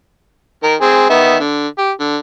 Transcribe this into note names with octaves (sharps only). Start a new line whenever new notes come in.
D#3 A#4
C4 G#4
D#3 B3 E5
D3
G4
D3